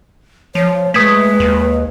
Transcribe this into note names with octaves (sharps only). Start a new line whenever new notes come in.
F3 C#5
G#3 A3 B4 D#6 G#6 B6
D#2